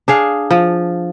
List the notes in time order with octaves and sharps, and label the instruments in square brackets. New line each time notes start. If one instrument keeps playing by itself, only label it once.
[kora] D4 G#4 F5
F3